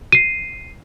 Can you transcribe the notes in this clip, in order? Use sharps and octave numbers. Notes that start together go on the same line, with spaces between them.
C7 D#7